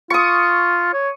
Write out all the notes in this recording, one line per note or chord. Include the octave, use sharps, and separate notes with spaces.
F4 C#6 D#6
C#5